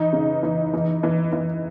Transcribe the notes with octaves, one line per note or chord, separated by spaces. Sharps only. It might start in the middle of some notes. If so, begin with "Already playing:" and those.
Already playing: E3 D#4
C#3
E3
E3
E3
E3